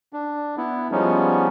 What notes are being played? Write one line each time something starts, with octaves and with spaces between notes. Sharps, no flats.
D4
B3 E4
F3 G3 G#3 B3 C#4 D#4